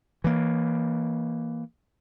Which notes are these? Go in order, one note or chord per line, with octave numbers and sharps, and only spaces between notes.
E3 A#3